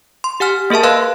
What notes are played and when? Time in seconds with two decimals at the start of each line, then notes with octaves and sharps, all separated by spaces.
0.24 C6
0.40 G4 F#5 G#5 F6
0.70 A#3 G#4 A#4 E5 A5
0.83 B4 D#5 F5 C6 E6 F#6